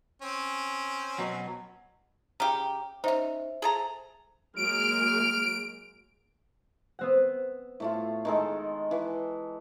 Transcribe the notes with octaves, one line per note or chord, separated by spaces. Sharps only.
C4 C#4
B2 F#3
C#3 G4 G5 A#5
C#4 D#4 C5 E5
G#4 A4 A#5
F#3 G#3 A#3 F6 D7
B3 C4 F#5
A2 A3 F4
D#3 G#3 A4
E3